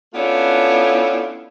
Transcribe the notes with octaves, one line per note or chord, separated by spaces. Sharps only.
A3 B3 C#4 D4 E4 F4